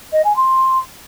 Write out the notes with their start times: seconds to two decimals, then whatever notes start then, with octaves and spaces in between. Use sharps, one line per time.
0.12 D#5
0.24 G#5
0.36 C6